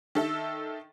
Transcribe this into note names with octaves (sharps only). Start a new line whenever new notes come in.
D#3 A4 E5